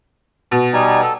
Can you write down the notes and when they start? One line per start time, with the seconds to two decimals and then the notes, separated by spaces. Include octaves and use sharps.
0.51 B2
0.73 G3 D#4 G#5
1.03 A4